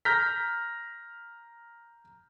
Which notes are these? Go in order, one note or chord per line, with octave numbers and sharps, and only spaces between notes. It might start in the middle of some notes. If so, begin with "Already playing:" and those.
A#5 F6 G6 A#6 B6